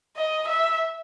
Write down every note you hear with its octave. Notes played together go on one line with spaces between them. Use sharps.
D#5
E5